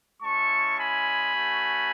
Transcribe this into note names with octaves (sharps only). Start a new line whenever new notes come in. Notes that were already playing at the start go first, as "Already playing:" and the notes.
G#3 C#4 E4 A5 C#6
G#5 B5
A3 C#4 F#4